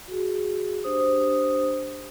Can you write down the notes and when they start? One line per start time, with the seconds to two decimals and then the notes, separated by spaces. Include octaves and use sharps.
0.08 F#4 G#4
0.84 D4 G4 C5 D#6